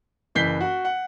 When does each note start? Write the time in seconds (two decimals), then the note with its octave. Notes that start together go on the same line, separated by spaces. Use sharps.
0.35 F#1 E3 G6 B6 C7 G7
0.60 F#4
0.85 F#5